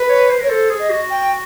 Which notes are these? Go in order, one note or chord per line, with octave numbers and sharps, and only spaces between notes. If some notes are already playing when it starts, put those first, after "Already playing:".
Already playing: B4
C#5
C5
A#4 C#5
A4 C5
G#4
D#5
F#4
G5